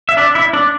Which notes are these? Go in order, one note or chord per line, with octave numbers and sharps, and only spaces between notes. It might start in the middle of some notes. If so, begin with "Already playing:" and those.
E5
D4 D5
E4 E5
D4 D5